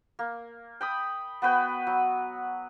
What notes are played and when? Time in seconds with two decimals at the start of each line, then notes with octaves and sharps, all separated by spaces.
0.19 A#3
0.81 G5 B5 D#6
1.42 B3 F#4 B4 G5
1.87 F#3